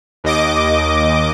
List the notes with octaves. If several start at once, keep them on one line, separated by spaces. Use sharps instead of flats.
D#2 D#5 D6